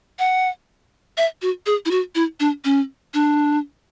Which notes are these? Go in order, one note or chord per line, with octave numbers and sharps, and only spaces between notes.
F#5
E5
F#4
G#4
E4
F#4
E4
D4
C#4
D4